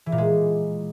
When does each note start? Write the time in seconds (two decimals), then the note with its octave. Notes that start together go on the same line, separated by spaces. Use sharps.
0.06 E3
0.12 A#2
0.18 G#3